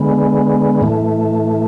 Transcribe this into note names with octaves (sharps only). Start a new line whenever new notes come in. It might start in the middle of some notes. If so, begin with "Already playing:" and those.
Already playing: D3 G#3 B3
A2 E3 A3